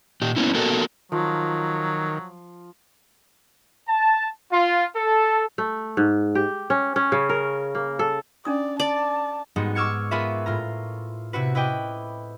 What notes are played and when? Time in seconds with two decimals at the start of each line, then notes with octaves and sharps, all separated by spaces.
0.22 A#2 G4
0.36 A#3 B3 C#4 E4
0.55 A#3 B3 F#4 A4 A#4
1.12 D#3 F3 F#3
3.87 A5
4.52 F4
4.95 A4
5.58 A3
5.97 G#2
6.35 G4
6.70 C#4
6.96 C#4
7.12 C#3
7.29 A#4
7.75 A#3
7.99 A4
8.45 C#4 D4 D5 D#6
8.80 D5 A5
9.56 G#2 G3 G#3 B3 D#4 F#4
9.75 C#6 D6 E6 F6 G#6 C#7
10.11 B3 F4 G#4 A#4 B4 E5
10.46 A2 F4 A#5
11.33 C3 E4 F#4 B4
11.55 E4 B4 D#5 G5 D6